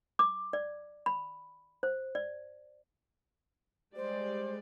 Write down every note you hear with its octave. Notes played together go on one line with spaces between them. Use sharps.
D6
D5
B5
C5
D5
G3 G#3 C5 D5